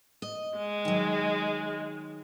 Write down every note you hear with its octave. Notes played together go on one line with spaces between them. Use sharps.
D#5
G#3
D#3 F#3